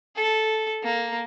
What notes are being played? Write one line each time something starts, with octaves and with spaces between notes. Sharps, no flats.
A4
A#3